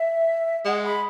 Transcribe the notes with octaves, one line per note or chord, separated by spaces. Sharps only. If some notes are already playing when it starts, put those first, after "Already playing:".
Already playing: E5
G#3 F#5
B5